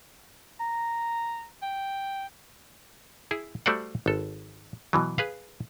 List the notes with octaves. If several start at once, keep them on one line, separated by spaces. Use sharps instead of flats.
A#5
G5
E4 G#4
G3 A3 F#4 C5 D5 F#5
G#1 A4
B2 E3 F#3
G#4 B4 F5